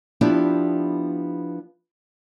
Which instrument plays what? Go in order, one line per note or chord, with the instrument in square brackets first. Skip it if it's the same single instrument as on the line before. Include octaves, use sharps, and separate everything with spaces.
[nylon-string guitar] F3 B3 D4 E4 G4